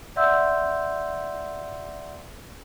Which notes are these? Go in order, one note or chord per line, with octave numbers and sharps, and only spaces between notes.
D5 E5 F#5 C6 E6 G6